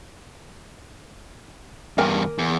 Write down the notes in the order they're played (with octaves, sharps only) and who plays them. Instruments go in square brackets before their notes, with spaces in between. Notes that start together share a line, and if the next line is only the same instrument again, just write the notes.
[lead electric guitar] E2 G2 [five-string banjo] A#3 A#4 G#5
[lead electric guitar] E2